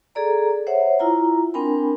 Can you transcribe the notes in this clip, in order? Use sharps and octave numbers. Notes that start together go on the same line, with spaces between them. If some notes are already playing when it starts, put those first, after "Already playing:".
G#4 A4 D5 A#5
C5 C#5 E5 F#5
E4 F4 A#5
C4 D4 A#4 G5 G#5 B5